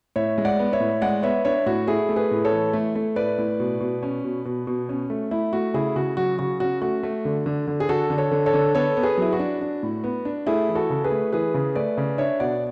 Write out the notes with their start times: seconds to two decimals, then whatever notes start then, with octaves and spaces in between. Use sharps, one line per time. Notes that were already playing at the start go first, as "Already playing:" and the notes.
0.16 A2 C#5 E5
0.38 G#3
0.45 D5 F#5
0.59 B3
0.73 C#5 E5
0.80 A2
1.01 G#3 D5 F#5
1.23 B3 C#5 E5
1.45 D4 C#5 E5
1.66 A2 F#4
1.87 A3 E4 G#4
2.09 A3
2.16 G#4 B4
2.31 A2
2.45 A4 C#5
2.52 E3
2.73 A3
2.95 A3
3.16 A2 B4 D5
3.38 A2
3.60 B2
3.80 B2
4.03 C#4
4.24 B2
4.45 B2
4.67 B2
4.89 C#4
5.10 A3
5.31 A3 E4
5.53 A3 F#4
5.74 C#3 E4 G#4
5.96 C#3 F#4
6.17 F#3 F#4
6.39 C#3 F#4
6.60 C#4 F#4
6.82 A3 F#4
7.03 A3
7.25 D3
7.46 D3
7.67 D3
7.80 G#4
7.89 D3 F#4 A4
8.10 D3
8.18 A4 C#5
8.31 D3
8.46 A4 C#5
8.54 D3
8.75 B3 A4 C#5
8.97 B3
9.03 G#4 B4
9.18 F#3 E4
9.33 F#4
9.39 D4
9.61 D4
9.83 A2
10.04 B3
10.25 D4
10.47 A3 E4 G#4
10.69 E3
10.75 F#4 A4
10.90 C#3
11.04 G#4 B4
11.11 A3
11.32 E3 G#4 B4
11.54 C#3
11.75 A3 B4 D5
11.97 C#3
12.18 D4 C#5 E5
12.40 B2 D5 F#5